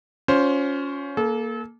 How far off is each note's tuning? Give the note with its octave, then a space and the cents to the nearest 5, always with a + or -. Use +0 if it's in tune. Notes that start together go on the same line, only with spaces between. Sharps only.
C#4 +15 F4 +30 C5 +0
A#3 +0 A4 -35